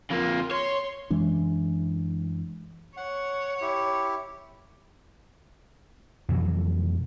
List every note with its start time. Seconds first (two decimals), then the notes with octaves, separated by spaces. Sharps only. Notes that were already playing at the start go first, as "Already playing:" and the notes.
0.11 F2 A#3 F4
0.51 C#5 C6
1.10 F#2 E3 G#3 D4
2.97 C#5 F#5
3.62 E4 G4
6.29 F2 B2 E3 F#3